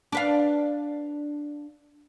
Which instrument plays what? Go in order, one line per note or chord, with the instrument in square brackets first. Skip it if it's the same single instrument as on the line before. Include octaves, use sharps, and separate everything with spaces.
[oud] D4 B4 F5